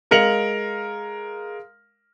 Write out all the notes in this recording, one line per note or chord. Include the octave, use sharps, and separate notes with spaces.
G#3 A#4 F5 C#7 F7 F#7